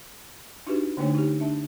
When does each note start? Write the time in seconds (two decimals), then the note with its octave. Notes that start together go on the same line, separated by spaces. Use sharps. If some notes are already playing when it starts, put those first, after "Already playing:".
0.67 D4 D#4 F#4 G4 B4
0.97 D3 A3 A#3 D4 D#4 C#5
1.15 D#4 G4
1.40 D4 E5 A5